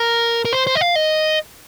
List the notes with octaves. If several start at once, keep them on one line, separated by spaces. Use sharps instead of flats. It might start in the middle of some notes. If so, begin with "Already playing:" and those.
Already playing: A#4
A#4
C5
C5
D#5
F5
D#5